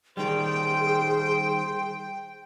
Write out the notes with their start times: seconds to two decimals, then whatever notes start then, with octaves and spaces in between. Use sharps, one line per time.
0.17 D#3 G3 G#4 C5 G5